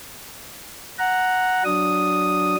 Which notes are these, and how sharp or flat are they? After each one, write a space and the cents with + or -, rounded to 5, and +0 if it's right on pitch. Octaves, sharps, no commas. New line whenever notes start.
F#5 +0 A#5 +0
F#3 +0 D4 +0 D#6 +0